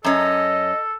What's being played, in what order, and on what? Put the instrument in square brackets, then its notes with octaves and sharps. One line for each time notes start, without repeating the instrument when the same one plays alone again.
[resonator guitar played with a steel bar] F#2 C#4 [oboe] A4 [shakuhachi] D#5